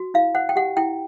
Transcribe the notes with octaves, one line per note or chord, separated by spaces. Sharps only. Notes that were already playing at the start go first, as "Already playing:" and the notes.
Already playing: F#4
E4 F5
C5 F#5
G5
G4 F#5
E4 G5